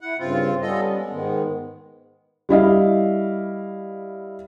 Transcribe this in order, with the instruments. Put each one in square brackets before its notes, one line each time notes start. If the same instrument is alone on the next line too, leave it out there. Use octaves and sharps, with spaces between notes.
[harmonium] E4 [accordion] F#5
[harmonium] G2 C#3 [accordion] C4 F4
[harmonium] G3 B3 C#4 [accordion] F4 A4 D#5
[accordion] G#3
[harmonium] G#2 D#3 B3
[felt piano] G3 E4 D#5 F5